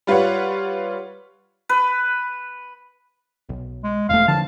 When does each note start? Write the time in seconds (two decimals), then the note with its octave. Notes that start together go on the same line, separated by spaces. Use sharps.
0.07 G3 F4 B4 C#5 F#5
1.69 B4
3.49 B1
3.84 G#3
4.09 E1 A3 F5
4.28 D3 F3 A5